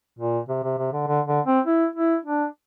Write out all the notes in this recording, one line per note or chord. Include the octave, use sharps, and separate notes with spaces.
A#2
C3
C3
C3
D3
D3
D3
C4
E4
E4
D4